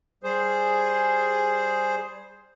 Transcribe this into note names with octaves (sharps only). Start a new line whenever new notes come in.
G3 G#4 C5